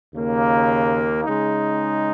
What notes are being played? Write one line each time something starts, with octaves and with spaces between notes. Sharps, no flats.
D#2 C#3 A#3
C#3 G#3 D#4